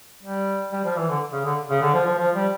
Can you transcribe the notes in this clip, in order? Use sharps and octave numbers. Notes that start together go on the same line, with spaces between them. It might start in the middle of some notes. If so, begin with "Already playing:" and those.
G3
G3
F3
E3
D3
C#3
D3
C#3
D3
F3
F3
F3
G3